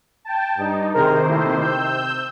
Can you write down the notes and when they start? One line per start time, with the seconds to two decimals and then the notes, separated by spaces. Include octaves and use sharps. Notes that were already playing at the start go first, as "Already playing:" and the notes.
0.25 G5 A5
0.58 G2 D#4
0.95 C3 D#3 G#4 A#4 C5
1.29 A#2 A3 E4
1.60 C3 E6 G6